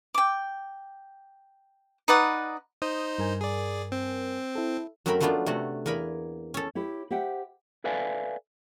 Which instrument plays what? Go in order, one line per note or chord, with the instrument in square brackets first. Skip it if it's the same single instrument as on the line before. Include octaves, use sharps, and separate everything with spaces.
[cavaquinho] G5 D6
D#4 B4 D5 F#5
[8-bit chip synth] D#4 C5 [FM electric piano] D#6
[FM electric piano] G2 A#4 G#5
[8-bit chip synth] G#4 D5
C4
[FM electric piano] E4 A4
[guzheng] F#2 F#3 A3 C4 A#4 B5
F3 F#3 A3 B3 D4 F4
C3 A3 F#4 A4
E2 A#3 A#4 G#5 B5
C#4 A4
[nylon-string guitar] E4 G4 C#5
G4 C5 E5 F#5 G5
[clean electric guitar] A4 B4 D5 E5 F5 G#5